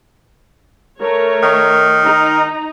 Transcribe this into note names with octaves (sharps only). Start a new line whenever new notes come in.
A3 A#4 C#5
D#3
D#4 A#5